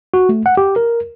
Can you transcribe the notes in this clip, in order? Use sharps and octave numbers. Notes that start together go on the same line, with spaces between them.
F#4
A3
F#5
G4
A#4